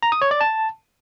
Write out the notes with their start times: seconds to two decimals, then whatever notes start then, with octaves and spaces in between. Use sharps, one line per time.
0.03 A#5
0.12 D#6
0.22 C#5
0.31 D5
0.41 A5